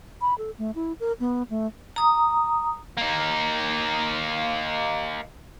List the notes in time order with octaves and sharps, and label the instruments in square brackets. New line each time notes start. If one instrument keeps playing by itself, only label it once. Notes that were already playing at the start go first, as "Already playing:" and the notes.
[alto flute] B5
A4
A3
E4
A#4
B3
A3
[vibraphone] A#5 D#6
[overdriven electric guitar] A#3 D#4